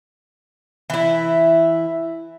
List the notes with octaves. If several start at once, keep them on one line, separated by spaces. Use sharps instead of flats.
E3 E4